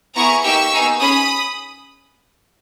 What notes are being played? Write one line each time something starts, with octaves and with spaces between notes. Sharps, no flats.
B3 E4 G#4 A#5 C#6
A#3 D#4 G4 C#6 E6
B3 D#4 G#4
C#4 G#4 B5 D#6